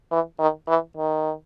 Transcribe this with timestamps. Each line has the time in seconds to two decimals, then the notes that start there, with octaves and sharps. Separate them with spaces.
0.11 E3
0.39 D#3
0.68 E3
0.97 D#3